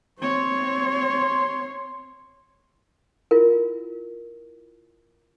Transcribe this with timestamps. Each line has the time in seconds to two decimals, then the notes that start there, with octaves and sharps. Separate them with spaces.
0.19 C4 C#5 C6
3.31 E4 F4 A#4